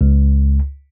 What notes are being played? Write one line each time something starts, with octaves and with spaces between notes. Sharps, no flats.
C#2